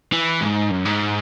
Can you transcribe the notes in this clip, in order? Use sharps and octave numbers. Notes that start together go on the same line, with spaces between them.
E3
G#2
F#2
G#2